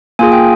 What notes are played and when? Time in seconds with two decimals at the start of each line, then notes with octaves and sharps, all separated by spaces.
0.19 A#3 F4 G#4 G#5
0.32 G5